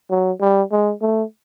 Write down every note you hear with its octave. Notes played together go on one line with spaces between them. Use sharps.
F#3
G3
G#3
A3